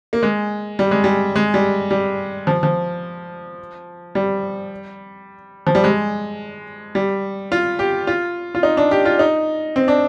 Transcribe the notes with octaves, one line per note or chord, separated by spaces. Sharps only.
A#3
G#3
G3
G#3
G3
G#3
G3
G3
F3
F3
G3
F3
G3
G#3
G3
F4
G4
F4
F4
D#4
D4
G4
F4
D#4
C4
D4